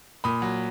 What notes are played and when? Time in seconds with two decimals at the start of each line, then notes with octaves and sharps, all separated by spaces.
0.24 A#2 B5 D#6
0.42 F#3